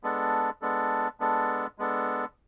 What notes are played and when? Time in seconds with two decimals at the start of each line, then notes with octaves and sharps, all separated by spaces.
0.03 G#3 B3 D4 A4
0.62 G#3 B3 D4 A4
1.20 G#3 B3 D4 A4
1.78 G#3 B3 D4 A4